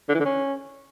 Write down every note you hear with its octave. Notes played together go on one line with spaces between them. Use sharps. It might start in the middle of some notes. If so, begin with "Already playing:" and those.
D3
E3
D3
C#4